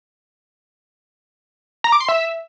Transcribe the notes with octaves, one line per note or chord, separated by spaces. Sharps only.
A#5
D6
C6
E5